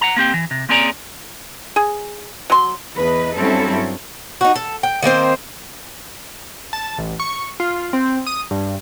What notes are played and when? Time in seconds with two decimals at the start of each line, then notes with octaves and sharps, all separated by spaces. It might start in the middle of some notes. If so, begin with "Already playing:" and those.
0.01 F#5 A#5
0.16 A#3 C4 G4 G5
0.34 E3
0.51 C3
0.69 A#3 C4 C#4 G#4 D5 A#5
1.76 G#4
2.50 F#3 C6
2.98 E2 B4 D#5
3.38 G2 F#3 C4 C#4 E4 A4
4.41 D#4 F#4
4.56 A4
4.83 G5
5.02 D#3 A#3 C4 C5
6.73 A5
6.98 A1
7.20 C#6
7.60 F4
7.93 C4
8.27 D#6
8.51 G2